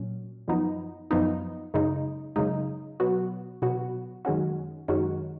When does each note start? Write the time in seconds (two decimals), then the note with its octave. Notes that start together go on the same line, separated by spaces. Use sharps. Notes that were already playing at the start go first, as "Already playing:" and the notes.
Already playing: A#2 F#3 C#4
0.48 F#2 F3 B3 D#4
1.11 F#2 F3 B3 D#4
1.74 F#2 C#3 G#3 D#4
2.36 F#2 C#3 G#3 D#4
3.00 B2 F#3 B3 F#4
3.62 B2 F#3 B3 F#4
4.25 F#2 D#3 G#3 C#4 F#4
4.88 F#2 D#3 G#3 C#4 F#4